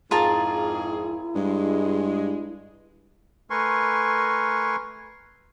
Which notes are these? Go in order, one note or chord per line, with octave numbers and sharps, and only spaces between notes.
F2 G#2 F4 G#4 A#4 A5
E4
G2 G#3
A3 A#4 B4 G#5 C6 C#6